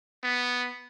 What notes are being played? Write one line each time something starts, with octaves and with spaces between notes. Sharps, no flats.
B3